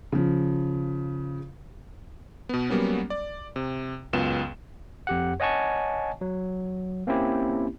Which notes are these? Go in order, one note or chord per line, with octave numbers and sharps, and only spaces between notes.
C#3 F3
B2 B3
F#3 G3 A#3 B3 C#4
D5
C3
C#2 F#2 B3 F4 E7
F2 G4 F#5
C#5 D#5 F#5 G#5 A5 C#6
F#3
A#3 C4 C#4 E4 G4